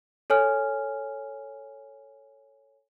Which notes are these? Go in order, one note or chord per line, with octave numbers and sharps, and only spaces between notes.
A4 C#5 G#5 F6